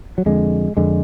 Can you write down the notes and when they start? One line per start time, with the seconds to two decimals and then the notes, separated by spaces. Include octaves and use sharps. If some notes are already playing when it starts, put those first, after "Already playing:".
0.18 F#3
0.26 F2 D3 G#3
0.77 F2 D3 G#3